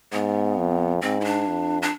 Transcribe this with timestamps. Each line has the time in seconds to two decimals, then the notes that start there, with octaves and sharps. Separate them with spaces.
0.13 G#2 B3
0.57 F2
1.02 G#2 C4
1.21 E4
1.25 D4
1.48 F2
1.82 D4